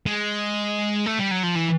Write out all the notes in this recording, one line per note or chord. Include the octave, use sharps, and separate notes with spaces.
G#3
A3
G3
F#3
F3
E3